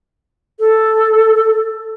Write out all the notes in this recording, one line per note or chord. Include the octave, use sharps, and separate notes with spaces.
A4